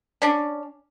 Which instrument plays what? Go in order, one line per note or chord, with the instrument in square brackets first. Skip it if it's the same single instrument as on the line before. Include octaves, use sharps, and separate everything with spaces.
[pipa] C#4 D4